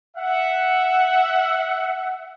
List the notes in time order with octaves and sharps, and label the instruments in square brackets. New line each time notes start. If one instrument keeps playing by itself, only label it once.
[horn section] E5 F#5